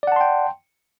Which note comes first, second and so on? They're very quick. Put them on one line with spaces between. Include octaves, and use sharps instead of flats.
D5 F#5 A5 C6 G5